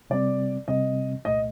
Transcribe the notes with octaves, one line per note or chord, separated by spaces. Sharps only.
C3 G3 C4 D5
C3 G3 C4 D#5
C2 A#2 A3 D#5